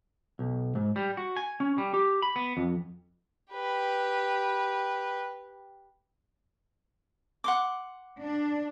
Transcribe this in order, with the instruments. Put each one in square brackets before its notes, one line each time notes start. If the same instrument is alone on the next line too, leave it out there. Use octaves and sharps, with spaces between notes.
[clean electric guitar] B1
G#2
G3
F#4
G#5
C#4
G3
G4
B5
B3
F2
[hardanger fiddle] G4 B4
[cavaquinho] F#5 C6 D6
[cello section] D4